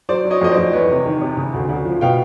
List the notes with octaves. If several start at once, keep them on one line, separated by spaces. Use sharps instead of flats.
F#3 C5 D5
F#3
C#5 D#5
F2 D#5
C5 D5
F2
E2 B4 C#5
C3
D#3
C3
C#3
D2
D2
F3
B2 F5 G5